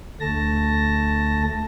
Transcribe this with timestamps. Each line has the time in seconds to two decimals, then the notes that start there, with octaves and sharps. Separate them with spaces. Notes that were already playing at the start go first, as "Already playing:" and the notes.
0.20 D2 A3 A5 A#6